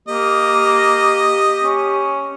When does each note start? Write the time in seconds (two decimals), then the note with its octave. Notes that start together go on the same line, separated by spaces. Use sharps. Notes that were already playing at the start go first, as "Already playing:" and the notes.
0.08 A#3 G4 D#5
1.63 C#4